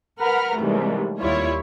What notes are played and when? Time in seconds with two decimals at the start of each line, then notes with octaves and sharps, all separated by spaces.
0.19 A#4 B4 F#5 A#5 B5 F6
0.58 D#2 G#2 C3 E3 G3 A3
1.19 D#2 G3 E4 F4 C#5